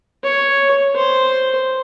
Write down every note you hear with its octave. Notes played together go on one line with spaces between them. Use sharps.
C#5
C5